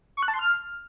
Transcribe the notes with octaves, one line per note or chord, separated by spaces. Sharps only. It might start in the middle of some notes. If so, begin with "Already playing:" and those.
C#6
F#6
A5
C6
F6